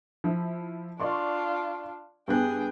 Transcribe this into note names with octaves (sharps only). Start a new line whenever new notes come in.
F3 E4
D4 F4 D5 C6 C#6
G2 B3 G#4 G5 F#6